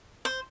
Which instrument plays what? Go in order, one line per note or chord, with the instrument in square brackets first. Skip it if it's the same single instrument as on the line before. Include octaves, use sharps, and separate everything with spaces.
[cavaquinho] C5